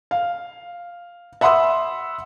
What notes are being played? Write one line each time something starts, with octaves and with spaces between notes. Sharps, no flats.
F5
E5 F#5 B5 C6 D#6 E6